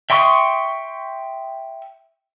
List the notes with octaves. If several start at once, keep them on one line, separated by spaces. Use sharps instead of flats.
E5 G5 C6 C#6 D#6